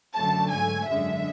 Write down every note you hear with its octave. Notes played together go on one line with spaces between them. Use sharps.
F#2 D3 F#3 A3 A5
G#2 F#3 A3 G#5
G#1 F#2 D3 G#3 E5